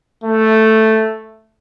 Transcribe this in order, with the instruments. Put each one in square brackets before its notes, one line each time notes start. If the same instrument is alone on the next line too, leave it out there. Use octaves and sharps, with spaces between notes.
[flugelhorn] A3